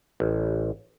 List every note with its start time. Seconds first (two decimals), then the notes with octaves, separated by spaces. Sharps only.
0.20 A1